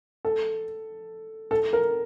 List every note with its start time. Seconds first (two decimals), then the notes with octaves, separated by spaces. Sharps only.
0.25 A4
1.51 A4
1.73 A#4